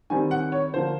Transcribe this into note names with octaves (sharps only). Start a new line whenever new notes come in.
D#3 G3 C4 G#5
F#5
C#5
D3 F3 A#3 C5